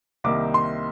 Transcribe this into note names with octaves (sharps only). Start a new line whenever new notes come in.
C2 C3 D#3 A#3 D6
C6